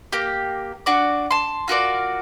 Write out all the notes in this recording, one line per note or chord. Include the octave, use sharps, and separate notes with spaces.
A#3 G4
D4 F#4 D5
A5 C6
F4 F#4 A#4 D5